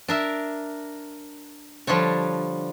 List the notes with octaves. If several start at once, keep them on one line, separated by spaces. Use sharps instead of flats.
D4 A#4 E5
D3 F3 G3 D4 C#5